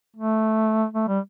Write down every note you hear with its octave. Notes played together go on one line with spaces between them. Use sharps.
A3
A3
G3